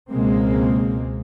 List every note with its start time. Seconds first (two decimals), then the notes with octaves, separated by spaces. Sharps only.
0.10 C#2 B2 G#3 A#3 C4